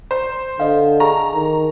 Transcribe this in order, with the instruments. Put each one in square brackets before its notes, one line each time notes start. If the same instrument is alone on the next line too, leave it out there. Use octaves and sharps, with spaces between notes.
[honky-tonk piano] C5
[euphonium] D3 [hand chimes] D#5 F5
[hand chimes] G#4 A5 C#6 [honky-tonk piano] A#5
[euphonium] D#3